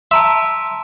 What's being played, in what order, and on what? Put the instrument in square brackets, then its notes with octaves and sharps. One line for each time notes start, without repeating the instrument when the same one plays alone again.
[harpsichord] E5 [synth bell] A5 A#5 C6